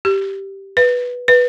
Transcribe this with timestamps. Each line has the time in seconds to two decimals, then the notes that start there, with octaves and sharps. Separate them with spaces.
0.05 G4
0.77 B4
1.28 B4